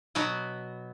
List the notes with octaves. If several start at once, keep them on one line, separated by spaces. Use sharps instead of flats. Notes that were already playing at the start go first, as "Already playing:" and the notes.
B2 F#3 B3 F#4